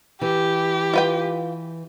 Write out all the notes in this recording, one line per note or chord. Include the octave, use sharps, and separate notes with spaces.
E3 G4
F4 B4 G5